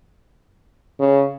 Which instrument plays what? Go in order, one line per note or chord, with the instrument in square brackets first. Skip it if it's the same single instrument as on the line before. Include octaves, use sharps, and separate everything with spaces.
[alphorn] C#3